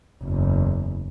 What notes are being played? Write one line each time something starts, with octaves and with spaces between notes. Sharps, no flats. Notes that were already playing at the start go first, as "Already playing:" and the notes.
F#1 E2